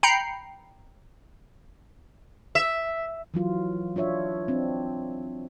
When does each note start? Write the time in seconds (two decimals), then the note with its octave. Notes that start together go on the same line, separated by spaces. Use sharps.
0.03 G5 A#5 B5 G6 C7 C#7
2.55 E5
3.34 E3 F#3 F4
3.96 D4 F4 C#5 E5
4.48 C4 D4